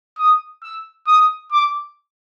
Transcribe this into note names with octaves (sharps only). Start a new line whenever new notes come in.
D#6
E6
D#6
D6